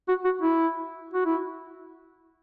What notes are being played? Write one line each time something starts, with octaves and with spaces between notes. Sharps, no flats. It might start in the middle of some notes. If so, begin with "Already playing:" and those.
F#4
F#4
E4
F#4
E4